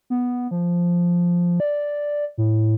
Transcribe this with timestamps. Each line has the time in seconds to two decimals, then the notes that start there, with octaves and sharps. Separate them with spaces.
0.10 B3
0.51 F3
1.60 D5
2.38 A2